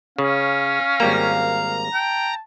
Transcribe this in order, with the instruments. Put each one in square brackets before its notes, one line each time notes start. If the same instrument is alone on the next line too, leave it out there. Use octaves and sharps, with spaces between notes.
[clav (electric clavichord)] C#3 [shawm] C#4 [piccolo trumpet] F5
[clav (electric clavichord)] G#1 G3 A#3 [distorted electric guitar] A#5
[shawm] G5 [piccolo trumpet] A5